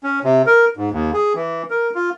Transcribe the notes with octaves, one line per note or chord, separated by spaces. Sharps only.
C#4
C3
A#4
G#2
D#2
G#4
E3
A#4
F4